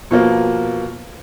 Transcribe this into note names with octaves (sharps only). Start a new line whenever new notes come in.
B2 F3 A#3